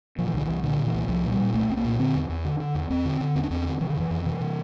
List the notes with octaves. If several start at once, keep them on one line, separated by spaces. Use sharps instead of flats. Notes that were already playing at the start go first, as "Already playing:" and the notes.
A#2 F3
E3
C2 D3
C2 E3
A#2 D3
A#2
E3
C2
C2 F3
A#2
G3
A#2
C2 A3
C2 C4
A#3
A#2
D3 C4
E2
E2
D3
D3
E2
E2 C4
D3
D3
E2 C4
D4
E2 C4
D3
C3 E3
D3
F2 E3
F2
C3 E3
C3